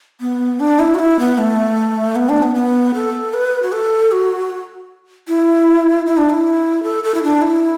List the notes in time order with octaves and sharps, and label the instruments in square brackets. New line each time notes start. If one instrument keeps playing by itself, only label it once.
[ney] B3
D4
E4
F#4
E4
B3
A3
B3
D4
B3
B3
A4
B4
F#4
A4
F#4
E4
E4
D4
E4
A4
A4
E4
D4
E4